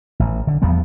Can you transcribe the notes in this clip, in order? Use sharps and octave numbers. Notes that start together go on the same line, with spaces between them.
A1
D3
E2 F3 G3 B3